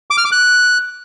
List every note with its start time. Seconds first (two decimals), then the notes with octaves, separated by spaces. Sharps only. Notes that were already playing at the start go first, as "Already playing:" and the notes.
0.11 D6
0.18 F6
0.25 D6
0.32 F#6